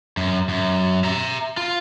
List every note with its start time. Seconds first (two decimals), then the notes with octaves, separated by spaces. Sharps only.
0.17 F#2
0.49 F#2
1.04 E5 A#5
1.57 F4